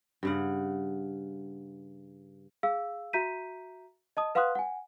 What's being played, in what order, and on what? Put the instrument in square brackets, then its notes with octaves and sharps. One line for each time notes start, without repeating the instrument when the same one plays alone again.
[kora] G2 C#3 F#5
[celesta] G#4 F5 E6
F#4 E5 A#5 G6 B6 D#7
D#5 A5 D#6
B4 F5 F#5 C6 D#6 F#6
F#5 G#5